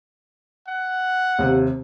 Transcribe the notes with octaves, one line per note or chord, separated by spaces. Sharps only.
F#5
D#2 C3